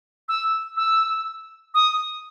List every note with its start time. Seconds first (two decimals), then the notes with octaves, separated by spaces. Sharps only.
0.29 E6
0.77 E6
1.74 D#6